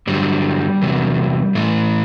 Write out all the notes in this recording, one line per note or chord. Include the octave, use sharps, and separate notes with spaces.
G2 D3 F#3 G3
E2 C3 F#3
A2 E3 A3